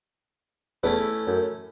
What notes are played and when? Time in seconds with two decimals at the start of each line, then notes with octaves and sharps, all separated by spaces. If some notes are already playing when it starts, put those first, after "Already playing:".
0.83 E2 A3 C#4 E4
1.27 F#2